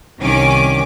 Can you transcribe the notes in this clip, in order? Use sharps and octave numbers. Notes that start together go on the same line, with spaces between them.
C2 D#3 C#4 D6